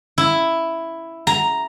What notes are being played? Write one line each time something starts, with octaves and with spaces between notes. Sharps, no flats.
E4
A#5